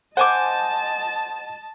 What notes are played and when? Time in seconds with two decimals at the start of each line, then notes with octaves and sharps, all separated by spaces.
0.17 C5 D#5 F#5 G#5 A5 D6